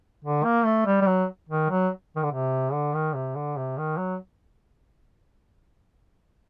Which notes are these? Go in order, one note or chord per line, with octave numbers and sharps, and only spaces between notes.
D3
A#3
A3
G3
G3
F#3
D#3
F#3
D#3
D3
C3
D3
D#3
C3
D3
C3
D#3
F#3